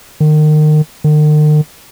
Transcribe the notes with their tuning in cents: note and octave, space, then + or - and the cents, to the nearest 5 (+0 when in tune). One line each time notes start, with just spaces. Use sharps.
D#3 -30
D#3 -45